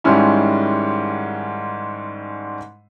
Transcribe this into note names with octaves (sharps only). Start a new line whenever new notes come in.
G#2 D#3 G3 G#3 C#4 E4